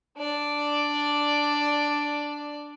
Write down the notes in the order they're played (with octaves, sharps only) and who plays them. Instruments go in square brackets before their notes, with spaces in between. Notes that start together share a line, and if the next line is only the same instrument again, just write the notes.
[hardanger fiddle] D4 D5